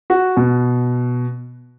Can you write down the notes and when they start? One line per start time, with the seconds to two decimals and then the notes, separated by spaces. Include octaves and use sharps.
0.10 F#4
0.36 B2